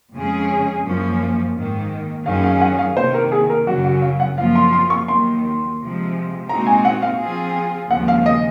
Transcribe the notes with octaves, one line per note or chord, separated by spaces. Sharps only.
F2 C#3 G#3 C#4 G#4
F#2 F3 A#3 C#4
G#2 D#3 A#3
F#2 D#3 F#3 C#4 G#4 F5
F5
F#5
F5
C3 D#3 A#3 C5
A#4
G#4
A#4
F#2 C#3 F#3 C#4 F#4
F#4
F5
F#5
F#2 F3 A#3 F4 F5
C6
C6
C#6
D#2 D#3 F#3 C6
C3 F3 G#3
A#2 G#3 C4 D#4 F#4 A#5
G#5
F#5
F5
F3 C4 F4 G#4
D#2 C#3 F3 G#3 F#5
F5
D#5